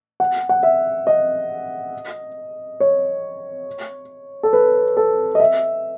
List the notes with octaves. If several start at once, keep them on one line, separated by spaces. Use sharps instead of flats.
F#5
F#5
E5
D#5
C#5
A4
B4
A4
D#5
E5